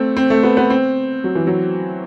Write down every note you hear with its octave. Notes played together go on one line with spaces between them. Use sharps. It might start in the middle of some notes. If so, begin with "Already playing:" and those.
Already playing: A3 C4
C4
A3
B3
B3
C4
F#3
E3
F#3